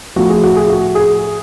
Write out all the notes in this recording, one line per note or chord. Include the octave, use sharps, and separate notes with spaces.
A2 F3 F#4
G#4
F#4
G#4
F#4
G#4